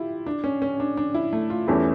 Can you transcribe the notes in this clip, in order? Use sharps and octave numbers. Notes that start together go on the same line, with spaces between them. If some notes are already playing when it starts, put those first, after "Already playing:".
Already playing: E4 F4 G4
D4
C#4
C#4
D4
D4
E4
A3
F4
E2 E3 A3 C#4 G4